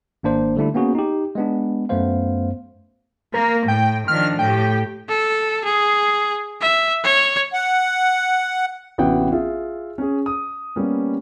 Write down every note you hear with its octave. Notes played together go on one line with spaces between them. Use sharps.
G#1 A#3 D4 C5
D3 G3 A3 D4 E4
A#3 B3 C#4 F#4 G#4
D#4 G4
G#3 B3 D4
F#2 A3 B3 C5 F5
A#3 A#4
A2 G5
D#3 F3 D4 F6
A2 G4 G5
A4
G#4
E5
C#5
F#5
A1 C3 B3 F#4 F#5 G5
F4 G#4 E5
C#4 G#4
D#6
G3 A#3 B3 C#4